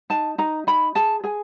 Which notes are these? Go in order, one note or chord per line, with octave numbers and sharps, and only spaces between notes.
D#4 A5
D#4 A#5
D#4 B5
G#4 A5
G#4 G#5